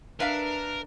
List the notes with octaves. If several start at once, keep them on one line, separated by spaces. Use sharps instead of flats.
D4 A#4 B4 E5 F5